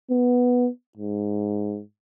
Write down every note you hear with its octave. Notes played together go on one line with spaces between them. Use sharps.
B3
G#2